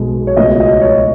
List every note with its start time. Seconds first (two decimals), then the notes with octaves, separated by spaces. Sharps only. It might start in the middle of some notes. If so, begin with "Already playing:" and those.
Already playing: B1 B2 G#3
0.27 C#5
0.36 C#2 B2 A3 D#5
0.60 D#5
0.81 C#5